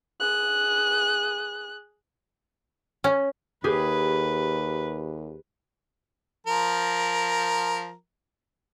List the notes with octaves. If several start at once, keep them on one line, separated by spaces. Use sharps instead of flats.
G#4 F#6
C#4
D#2 G4 G#4 B4
F3 A#4